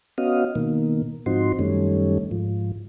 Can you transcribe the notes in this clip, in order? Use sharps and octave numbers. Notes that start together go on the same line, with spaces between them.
B3 C#4 F#4 D#5 F5
B2 D#3 A#3
G#2 F3 C4 D#4 F#4 C6
F#2 D#3 G3 A3 C#4
G#2 F3